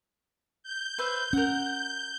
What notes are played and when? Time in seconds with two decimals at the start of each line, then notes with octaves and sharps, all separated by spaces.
0.63 G6
0.98 B4 C5 E5
1.33 C#4 A#4 F#5